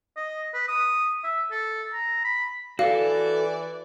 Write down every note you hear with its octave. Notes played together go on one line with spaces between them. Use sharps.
D#5
B4
D#6
E5
A4
A#5
B5
E3 F#4 A4 D5 F5